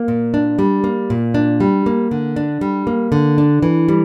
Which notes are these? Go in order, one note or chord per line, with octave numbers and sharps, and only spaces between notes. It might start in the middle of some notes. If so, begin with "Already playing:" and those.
Already playing: A#3
A#2
D4
G3
A#3
A#2
D4
G3
A#3
D3
D4
G3
A#3
D3
D4
E3
G3